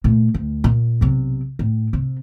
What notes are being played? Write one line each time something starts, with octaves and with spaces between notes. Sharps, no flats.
A#2 A3
D2
A#2
B1 C3
A2
C3